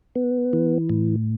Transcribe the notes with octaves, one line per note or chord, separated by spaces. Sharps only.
B3
E3
A2